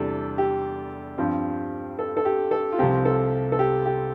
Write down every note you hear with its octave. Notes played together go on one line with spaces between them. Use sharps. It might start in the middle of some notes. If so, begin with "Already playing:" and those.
Already playing: E2 C3 G3 D4 A4
G4
G2 F3 C4
A4
A4
G4
A4
F4
C2 C3 F3 C4 G4
A4
A4
G4
G4